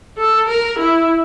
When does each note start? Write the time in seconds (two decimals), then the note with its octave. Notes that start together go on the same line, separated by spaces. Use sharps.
0.17 A4
0.48 A#4
0.79 E4